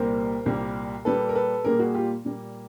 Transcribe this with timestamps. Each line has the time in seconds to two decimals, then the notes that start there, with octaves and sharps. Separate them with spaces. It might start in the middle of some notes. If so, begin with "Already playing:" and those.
Already playing: C2 A#2 G3 A#3 A#4 C5
0.46 C2 A#2 G3 A#3
1.05 A#2 G3 A#3 A4 B4
1.29 A#4
1.35 A4 B4
1.64 A#2 G3 A#3 G#4 A#4
1.79 F#4 G#4
1.94 F4 G4
2.25 A#2 G3 A#3